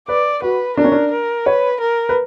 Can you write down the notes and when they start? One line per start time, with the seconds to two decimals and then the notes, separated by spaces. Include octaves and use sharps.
0.08 B4 D5
0.42 F#4 B4
0.77 D4 A#4
0.84 C#4
0.92 D4
1.11 A#4
1.46 B4 C#5
1.80 A#4
2.09 B4